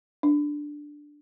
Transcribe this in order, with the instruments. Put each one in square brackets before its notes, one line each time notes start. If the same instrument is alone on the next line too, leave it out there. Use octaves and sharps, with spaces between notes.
[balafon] D4